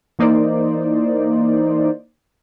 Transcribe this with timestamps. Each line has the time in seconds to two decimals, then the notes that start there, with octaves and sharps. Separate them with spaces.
0.19 E3 A#3 D#4 C5 D5